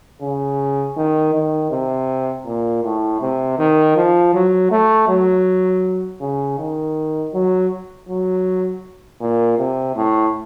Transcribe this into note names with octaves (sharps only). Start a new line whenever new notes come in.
C#3
D#3
D#3
C3
A#2
A2
C3
D#3
F3
F#3
A3
F#3
C#3
D#3
F#3
F#3
A#2
C3
A2